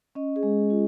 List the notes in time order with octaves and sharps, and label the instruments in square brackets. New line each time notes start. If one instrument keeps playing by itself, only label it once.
[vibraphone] C#4 D#5
G#4
G#3
F4